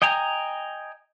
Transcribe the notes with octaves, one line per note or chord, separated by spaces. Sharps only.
D#5 G5 G#5 A#5